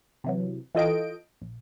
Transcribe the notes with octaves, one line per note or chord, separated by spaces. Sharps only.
C3 E3 F#3
E3 F4 A4 D#5 G5 D7
A#1